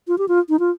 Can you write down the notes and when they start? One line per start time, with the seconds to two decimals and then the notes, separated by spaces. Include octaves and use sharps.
0.08 F4
0.18 G4
0.28 F4
0.49 D#4
0.59 F4